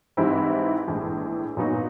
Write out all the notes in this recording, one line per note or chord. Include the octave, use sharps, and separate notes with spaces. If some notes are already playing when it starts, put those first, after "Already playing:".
G#2 E3 G3 C4 E4
A#1 A2 E3 G#3
A#2 F#3 B3 D#4 F#4